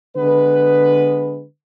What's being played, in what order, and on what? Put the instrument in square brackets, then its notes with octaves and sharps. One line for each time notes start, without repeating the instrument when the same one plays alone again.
[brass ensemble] D3 G#3 B3 B4